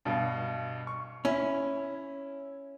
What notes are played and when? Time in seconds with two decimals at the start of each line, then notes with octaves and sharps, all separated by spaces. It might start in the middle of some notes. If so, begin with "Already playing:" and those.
0.05 G2 B2
0.87 C#6
1.25 C#4 E4